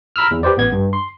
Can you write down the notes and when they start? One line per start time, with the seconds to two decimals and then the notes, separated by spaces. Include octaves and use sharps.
0.16 A#5 B5 E6 F6
0.31 E2
0.43 G4 B4 C5 D5
0.57 A1 B3 G#6
0.72 G2
0.93 C6